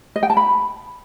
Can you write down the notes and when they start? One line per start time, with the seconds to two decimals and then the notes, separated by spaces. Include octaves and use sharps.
0.16 D#5
0.23 G5
0.30 A5
0.37 B5